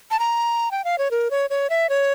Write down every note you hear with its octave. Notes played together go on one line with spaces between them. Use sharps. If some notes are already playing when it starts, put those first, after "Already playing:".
A5
A#5
G5
F5
C#5
A#4
C#5
C#5
E5
C#5